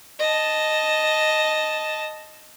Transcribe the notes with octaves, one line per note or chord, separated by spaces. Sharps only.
D#5 A5